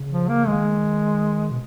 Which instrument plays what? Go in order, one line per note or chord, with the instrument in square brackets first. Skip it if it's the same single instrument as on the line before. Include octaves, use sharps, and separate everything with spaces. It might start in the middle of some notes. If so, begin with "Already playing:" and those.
Already playing: [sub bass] C#3
[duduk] F3
A#3
[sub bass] D#3 [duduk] G#3
[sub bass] B2